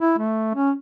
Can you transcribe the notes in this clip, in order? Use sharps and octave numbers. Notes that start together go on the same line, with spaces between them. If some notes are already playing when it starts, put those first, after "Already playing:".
E4
A3
C#4